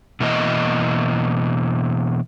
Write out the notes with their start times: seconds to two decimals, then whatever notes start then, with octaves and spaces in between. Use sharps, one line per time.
0.20 B2 E3 A#3 D#5